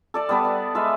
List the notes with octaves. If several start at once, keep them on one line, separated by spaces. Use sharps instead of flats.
A4 D5 A5
G3 B3 B4
F#5
G#3 B4 E5 F5